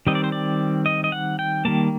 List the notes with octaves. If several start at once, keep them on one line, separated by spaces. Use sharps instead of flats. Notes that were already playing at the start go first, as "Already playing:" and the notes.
D#3 G3 C4 D#5
D5
C5
D5
D#5
D#5
F#5
G5
D#3 G3 A#3 A5